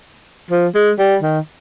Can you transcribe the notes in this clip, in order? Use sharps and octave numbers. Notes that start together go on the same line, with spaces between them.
F3
G#3
G3
D#3